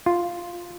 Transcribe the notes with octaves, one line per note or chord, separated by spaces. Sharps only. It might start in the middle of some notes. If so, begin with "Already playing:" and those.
F4